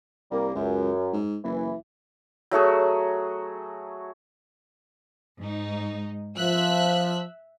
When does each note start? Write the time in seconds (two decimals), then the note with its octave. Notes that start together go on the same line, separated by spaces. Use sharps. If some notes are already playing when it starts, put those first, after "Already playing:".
0.32 C2 G3 A#3
0.56 C#2 F#2
1.13 G#2
1.44 F#1 E3
2.51 F#3 A3 F#4 G#4
5.38 G#2 D#4
6.38 F3 E5 E6 F#6